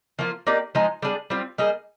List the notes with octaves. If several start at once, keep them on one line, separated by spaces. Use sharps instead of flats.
F3 A#3 F4
A#3 D#4 G4 D5
F3 G#3 D#4
G3 D4 G#4
G3 C4 F4
G3 A#3 D#4 G#4